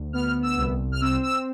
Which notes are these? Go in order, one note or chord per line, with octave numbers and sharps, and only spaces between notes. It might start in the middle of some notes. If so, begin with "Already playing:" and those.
Already playing: D2
B3 F6
E6
C2
F6
C4 E6
E6